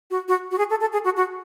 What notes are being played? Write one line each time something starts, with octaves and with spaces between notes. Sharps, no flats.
F#4
F#4
F#4
G#4
A4
A4
G#4
F#4
F#4